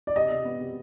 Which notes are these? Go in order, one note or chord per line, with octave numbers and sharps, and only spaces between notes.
D5
C3 D#5
C3
B3
C3